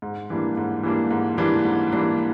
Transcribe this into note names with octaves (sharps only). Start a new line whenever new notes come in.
G#2
E3 G3 A#3 D4
G#2
E3 G3 A#3 D4
G#2
E3 G3 A#3 D4
G#2
E3 G3 A#3 D4